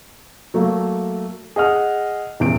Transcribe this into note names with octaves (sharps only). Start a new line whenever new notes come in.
F#3 A3 A#3
G#4 D#5 F#5 F6
D#1 E2 C#3 D7